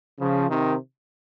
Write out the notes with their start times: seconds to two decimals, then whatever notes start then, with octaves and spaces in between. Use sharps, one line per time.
0.19 C#3 F3
0.49 C3 D#3